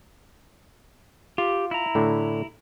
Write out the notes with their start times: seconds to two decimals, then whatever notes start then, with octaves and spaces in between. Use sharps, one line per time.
1.38 F4 G4
1.71 E4 A#5
1.95 A2 D3